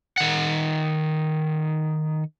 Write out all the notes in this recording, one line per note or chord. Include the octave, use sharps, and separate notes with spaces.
D#3 F#5